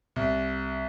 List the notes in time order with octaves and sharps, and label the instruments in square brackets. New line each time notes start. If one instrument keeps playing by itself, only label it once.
[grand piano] C2